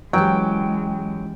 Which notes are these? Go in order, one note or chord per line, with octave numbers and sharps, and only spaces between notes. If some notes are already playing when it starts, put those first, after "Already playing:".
E3 F#3 G#3 C#4 G4 G5